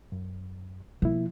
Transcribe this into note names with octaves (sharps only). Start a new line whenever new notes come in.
F#2
B2 F3 A#3 E4